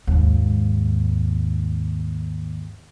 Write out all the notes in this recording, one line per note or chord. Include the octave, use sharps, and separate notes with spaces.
D#2 G#2